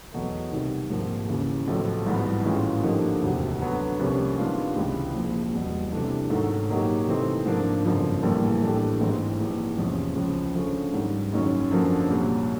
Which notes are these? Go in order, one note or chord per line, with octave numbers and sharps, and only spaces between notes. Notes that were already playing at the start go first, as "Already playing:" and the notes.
E2 B2 F#3 A3
C2 C3 D#3
A#1 G#2 F3 A#3
D#2 C#3 E3
B1 A2 F3 A3
G#1 G#2 E3 G3 B3
A2 E3 G#3 C#4 F4
D3 F3 A#3 D#4 G4
E1 D2 C3
D3 F#3 B3
C2 C3 F3 A#3 C#4
D#3 G#3 B3 D4 F4
C#2 C3 E3 G#3
A#1 A#2 F3
E1 E2 B2 G3
C3 E3 A3 D4
G#2 D#3 F#3 A3
A#2 F#3 A#3 D#4 G4
C3 E3 A3 C4 D#4
G#2 F3 A#3 D4
G1 F#2 C#3 F3 A#3
A#1 A2 E3 G3 A#3
A2 E3 A3 D4 G4
A1 G#2 E3 G#3 C4
A#1 G#2 E3
E2 C3 F3 G#3 C#4
C#2 C#3 F3
D3 F3 A3 C#4
G#2 D#3 G3
F#1 F#2 D#3 G#3 C#4
F#2 D3 F3 A#3 D4
C2 A#2 F#3